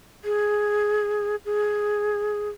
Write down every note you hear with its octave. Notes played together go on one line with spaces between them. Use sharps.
G#4
G#4